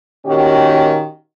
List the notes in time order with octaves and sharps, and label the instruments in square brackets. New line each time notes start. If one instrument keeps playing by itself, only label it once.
[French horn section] A#2 D#3 C#4 F#4 G4